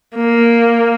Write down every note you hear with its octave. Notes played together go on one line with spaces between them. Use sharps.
A#3